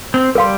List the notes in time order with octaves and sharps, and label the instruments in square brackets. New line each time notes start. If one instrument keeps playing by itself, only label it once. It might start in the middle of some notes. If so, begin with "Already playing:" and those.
[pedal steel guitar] C4
[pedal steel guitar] G3 [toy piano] A#4 F5 C6